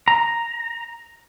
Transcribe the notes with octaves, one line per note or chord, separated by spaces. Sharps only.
A#5